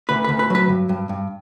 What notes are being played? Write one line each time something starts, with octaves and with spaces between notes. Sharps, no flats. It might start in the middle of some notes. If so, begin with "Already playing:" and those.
D2 B4
B4
D2
B4
F#3 B4
G2
G2
G2